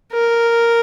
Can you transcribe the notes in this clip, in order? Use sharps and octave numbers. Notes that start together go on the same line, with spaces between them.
A#4